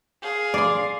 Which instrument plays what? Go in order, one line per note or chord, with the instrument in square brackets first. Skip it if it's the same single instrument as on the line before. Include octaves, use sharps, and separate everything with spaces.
[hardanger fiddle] G#4 F5
[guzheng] D5 C6